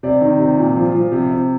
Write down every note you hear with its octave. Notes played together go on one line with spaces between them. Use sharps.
C3 D5
D#3
C3
A#2
F3
F3
C3
C3